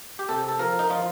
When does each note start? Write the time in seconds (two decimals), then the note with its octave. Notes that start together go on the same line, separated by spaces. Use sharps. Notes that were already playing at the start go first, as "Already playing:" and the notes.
0.19 G4
0.29 C3 A4
0.49 A4
0.59 F3 A#4
0.79 D#4
0.90 F3 F4